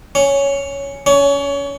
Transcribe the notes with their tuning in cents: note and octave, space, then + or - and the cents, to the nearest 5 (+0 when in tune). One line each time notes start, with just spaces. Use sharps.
C#4 +5
C#4 +25